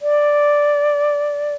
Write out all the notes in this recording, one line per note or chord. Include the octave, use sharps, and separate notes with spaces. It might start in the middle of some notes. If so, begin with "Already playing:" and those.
D5